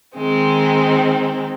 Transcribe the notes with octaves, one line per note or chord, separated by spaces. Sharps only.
D#3 G#3 C4